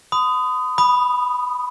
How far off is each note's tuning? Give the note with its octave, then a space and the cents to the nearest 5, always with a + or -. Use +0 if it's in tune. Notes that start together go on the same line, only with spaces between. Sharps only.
B5 +40 D#6 +0
B5 +0 D#6 -15